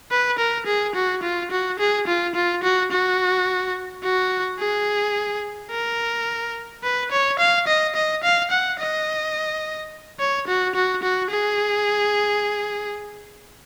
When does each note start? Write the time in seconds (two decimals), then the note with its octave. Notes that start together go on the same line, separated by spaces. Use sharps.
0.11 B4
0.39 A#4
0.67 G#4
0.95 F#4
1.23 F4
1.51 F#4
1.79 G#4
2.07 F4
2.35 F4
2.63 F#4
2.91 F#4
4.03 F#4
4.59 G#4
5.71 A#4
6.83 B4
7.11 C#5
7.39 F5
7.67 D#5
7.95 D#5
8.23 F5
8.51 F#5
8.79 D#5
10.20 C#5
10.48 F#4
10.75 F#4
11.03 F#4
11.31 G#4